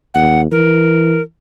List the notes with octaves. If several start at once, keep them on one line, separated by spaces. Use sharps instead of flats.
D#2 F#5
E3 A#4